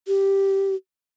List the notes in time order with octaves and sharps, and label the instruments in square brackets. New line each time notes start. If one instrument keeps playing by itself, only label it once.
[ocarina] G4